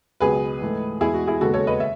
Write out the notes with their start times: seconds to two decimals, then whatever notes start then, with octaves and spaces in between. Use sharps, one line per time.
0.20 C#2 B2 F#3 G#4 B4
0.61 G#2 E3 A3
1.01 E2 B2 G#3 E4 G#4
1.14 F#4
1.27 E4 G#4
1.41 D#2 C#3 G#3 B3 F#4 A4
1.54 A4 C#5
1.67 B4 D#5
1.80 E5